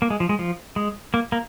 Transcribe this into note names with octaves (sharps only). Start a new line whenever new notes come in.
A#3
G#3
F3
G#3
F3
G#3
A#3
A#3